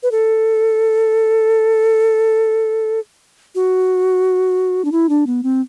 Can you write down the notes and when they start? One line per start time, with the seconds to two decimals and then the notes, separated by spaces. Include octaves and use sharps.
0.03 B4
0.11 A4
3.55 F#4
4.85 D4
4.92 E4
5.09 D4
5.26 B3
5.43 C4